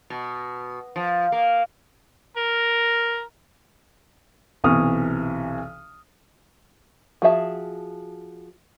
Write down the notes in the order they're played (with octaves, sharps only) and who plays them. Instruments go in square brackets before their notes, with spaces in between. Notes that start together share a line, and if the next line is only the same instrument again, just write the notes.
[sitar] B2
F3
A#3
[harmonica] A#4
[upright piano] B1 C3 E3 C#6 D#6 F6
[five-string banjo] F3 F#4 G#4 E5 A5